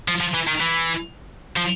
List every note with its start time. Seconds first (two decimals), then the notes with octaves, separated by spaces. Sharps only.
0.08 F3
0.21 F3
0.34 E3
0.47 D#3
0.60 E3
1.56 F3